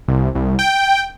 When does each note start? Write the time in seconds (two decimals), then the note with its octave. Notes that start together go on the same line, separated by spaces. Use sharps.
0.08 C2
0.35 C2
0.59 G5